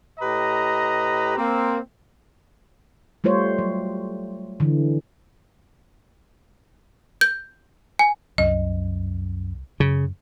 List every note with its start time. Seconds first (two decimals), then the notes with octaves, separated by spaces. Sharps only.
0.20 A2 G4 B4 D#5 A#5
1.37 A#3 C4
3.24 G3 A3 F4 C5 C#5
3.59 F#3
4.60 D3 E3
7.21 G6
7.99 G#5
8.38 C2 F#2 D#5
9.80 F#2 C#3